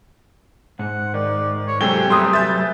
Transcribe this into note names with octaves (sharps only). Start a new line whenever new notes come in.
G#2 F#5
D#3 D5
C#5
C3 F#3 G#3 A4 G5 G#5 G7
F#3 G3 A3 B4 C6 D#6
E5 G#5 G6 A6